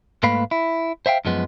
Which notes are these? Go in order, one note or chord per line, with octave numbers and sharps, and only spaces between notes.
G#2 A3 A#3 B4 F5 B5
E4
C5 E5 F5 G5
F#2 F3 G#3 B3